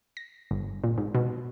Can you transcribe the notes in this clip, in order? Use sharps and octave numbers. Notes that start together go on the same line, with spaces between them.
A#6
G1
A#2
G#2
B2